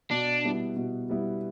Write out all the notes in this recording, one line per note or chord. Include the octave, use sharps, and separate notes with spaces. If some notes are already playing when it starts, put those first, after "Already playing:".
B2 D4
G3 B3 E4
B2
G3 B3 E4